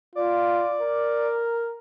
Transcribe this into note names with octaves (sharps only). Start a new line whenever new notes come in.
F4 D5
A#4